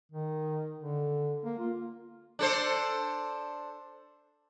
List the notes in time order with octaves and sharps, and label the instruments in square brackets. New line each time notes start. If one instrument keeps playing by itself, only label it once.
[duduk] D#3
D3
A#3
F4
[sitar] D4 A4 C5